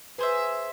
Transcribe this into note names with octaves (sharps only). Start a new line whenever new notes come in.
G#4 B4 C5 E5